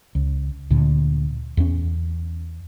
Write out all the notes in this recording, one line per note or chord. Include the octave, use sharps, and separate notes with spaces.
C#2
D2 A#2 D3
E2 C#4